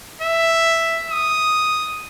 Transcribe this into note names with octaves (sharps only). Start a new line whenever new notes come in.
E5
D#6